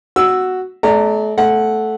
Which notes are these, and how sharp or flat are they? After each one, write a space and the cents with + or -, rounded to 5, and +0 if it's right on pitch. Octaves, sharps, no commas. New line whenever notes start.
F#4 +0 E6 +0
A3 -40 D5 +0 A#5 -25
A3 -10 F#5 +0